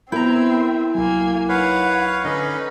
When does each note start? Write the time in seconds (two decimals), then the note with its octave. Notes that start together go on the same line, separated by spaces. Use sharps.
0.12 B3 C4 E4 A#4 E5 A#5 G6
0.95 C2 F#3 A#3 G#5
1.49 D#4 B4 C#5 F5 F#5
2.24 D3 C#4 D#4 B4 D#5